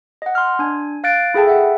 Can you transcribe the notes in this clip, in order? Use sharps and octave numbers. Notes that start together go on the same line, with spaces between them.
D#5 F#5
C6 F6
D4 G#5
F5 F#6 A6 D7
E4 G#4 A4 G5 A5
E5 F#5